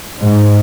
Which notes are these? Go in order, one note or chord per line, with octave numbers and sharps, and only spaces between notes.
G#2